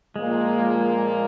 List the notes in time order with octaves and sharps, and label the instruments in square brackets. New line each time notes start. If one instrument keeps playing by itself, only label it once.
[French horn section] A#2 F3 A#3 [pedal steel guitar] G#3